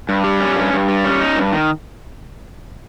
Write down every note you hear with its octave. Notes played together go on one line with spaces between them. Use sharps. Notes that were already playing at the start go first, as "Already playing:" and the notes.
G2
G3
C#4
G2
G2
G3
C#4
D#4
G2
D#3